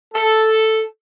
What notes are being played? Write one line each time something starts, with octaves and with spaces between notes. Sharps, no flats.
A4